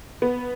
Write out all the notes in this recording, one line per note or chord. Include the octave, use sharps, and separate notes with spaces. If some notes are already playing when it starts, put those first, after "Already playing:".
B3